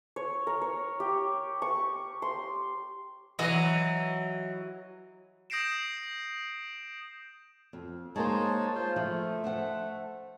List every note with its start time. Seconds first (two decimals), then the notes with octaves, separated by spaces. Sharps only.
0.16 C#5
0.47 A#4
0.61 C#5
1.00 G4
1.62 C#6
2.22 C6
3.39 E3 F#3 D#5
5.50 D#6 G6 A#6 C7 D7 E7
7.73 F2
8.16 G#3 A#3 D#4 C5 C#5 A5
8.75 F4 C5
8.96 F3 A3
9.44 C5 E5 F#5